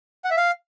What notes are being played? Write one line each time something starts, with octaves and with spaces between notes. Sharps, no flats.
F#5
E5
F5